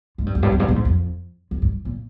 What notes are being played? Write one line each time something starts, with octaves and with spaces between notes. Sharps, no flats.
G#2
G2
F2
G2
F2
G2
A#2
G#2
F2
F2
G2
A#2